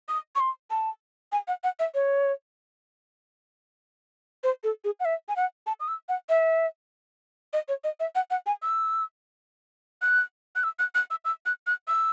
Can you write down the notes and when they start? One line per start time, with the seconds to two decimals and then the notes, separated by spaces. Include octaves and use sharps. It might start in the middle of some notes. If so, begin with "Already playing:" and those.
0.08 D#6
0.35 C#6
0.40 C6
0.71 A5
1.32 G#5
1.48 F#5
1.64 F#5
1.79 E5
1.94 C#5
4.44 C5
4.64 A4
4.84 G#4
5.00 F#5
5.05 E5
5.29 G#5
5.36 F#5
5.67 A5
5.80 D#6
5.88 E6
6.09 F#5
6.29 E5
7.53 D#5
7.68 C#5
7.84 D#5
8.00 E5
8.15 F#5
8.31 F#5
8.46 G#5
8.62 E6
10.02 F#6
10.56 F#6
10.64 E6
10.79 F#6
10.95 F#6
11.10 E6
11.25 E6
11.46 F#6
11.67 F#6
11.88 E6